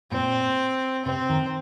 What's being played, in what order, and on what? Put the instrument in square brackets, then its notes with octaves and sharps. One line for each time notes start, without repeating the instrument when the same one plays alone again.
[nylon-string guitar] A#2 [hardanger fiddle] C4
[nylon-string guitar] C3 [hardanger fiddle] C4
[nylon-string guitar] D#3